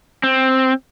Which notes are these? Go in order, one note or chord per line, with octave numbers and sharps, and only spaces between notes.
C4